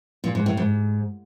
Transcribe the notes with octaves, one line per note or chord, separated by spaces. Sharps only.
A#2
G#2
A2
G#2